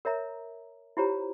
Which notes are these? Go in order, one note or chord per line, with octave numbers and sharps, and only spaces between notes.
A#4 C#5 E5 A#5
E4 F4 G4 C5 C#5 A#5